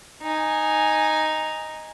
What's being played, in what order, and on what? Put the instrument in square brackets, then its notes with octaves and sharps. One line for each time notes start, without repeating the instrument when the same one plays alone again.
[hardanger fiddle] D#4 G#5